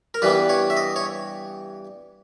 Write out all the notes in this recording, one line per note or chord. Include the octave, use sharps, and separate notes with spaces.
A#4
G2 E3 G3 B3 B4
C#5
E5
D#5
C#5